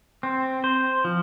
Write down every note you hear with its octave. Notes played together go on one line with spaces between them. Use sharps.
C4
C5
F3